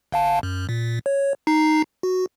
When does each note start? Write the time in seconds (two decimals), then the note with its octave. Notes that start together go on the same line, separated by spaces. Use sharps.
0.12 G1 F5 A5
0.43 F#2
0.69 A#2
1.06 C#5
1.47 D#4 A#5 C7
2.03 F#4